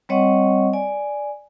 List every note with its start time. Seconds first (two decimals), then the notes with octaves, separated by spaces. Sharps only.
0.09 G3 C4 C#5 D#5 F#5 C#6
0.73 D5 G#5